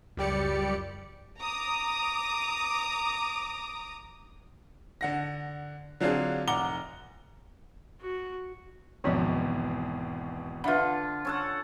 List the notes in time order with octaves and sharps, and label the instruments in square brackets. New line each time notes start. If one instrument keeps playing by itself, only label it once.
[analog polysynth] C#2 F#2 G3 G4 D5 C#7
[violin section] A#5 D6 D#6
[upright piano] D3 F#5 A#6
D3 F#3 C4 D4 F4 G#4
F1 F#5 A#5 D6 G7
[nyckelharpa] F#4
[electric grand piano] G#1 E2 B2 [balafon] F3 C#4 D#5
[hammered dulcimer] D3 F4 [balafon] B4 E5 B5
[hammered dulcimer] C#4 A4 F#5